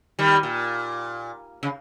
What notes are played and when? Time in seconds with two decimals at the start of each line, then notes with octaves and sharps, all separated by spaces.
0.19 D#3 G3
0.43 A#2
1.63 C#3